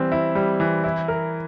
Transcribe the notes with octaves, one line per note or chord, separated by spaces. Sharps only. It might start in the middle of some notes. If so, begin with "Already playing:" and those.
Already playing: E3 G3 C4
E4
G3
E3
E4
A#4